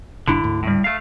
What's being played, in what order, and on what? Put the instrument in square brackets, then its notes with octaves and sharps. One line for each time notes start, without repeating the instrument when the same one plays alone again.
[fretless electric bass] D#1 G2 D4 [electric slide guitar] D3 E4
[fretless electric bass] D2 G#2
[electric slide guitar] A2 G3
A3 F5